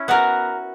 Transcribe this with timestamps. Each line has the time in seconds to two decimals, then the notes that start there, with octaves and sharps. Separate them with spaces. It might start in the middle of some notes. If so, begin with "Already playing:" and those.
Already playing: C#4 E4
0.08 B3 F#4 A#4